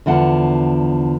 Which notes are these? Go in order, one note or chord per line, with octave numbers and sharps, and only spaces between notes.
E2 D3 F3 F#5